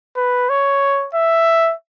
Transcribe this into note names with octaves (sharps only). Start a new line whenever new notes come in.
B4
C#5
E5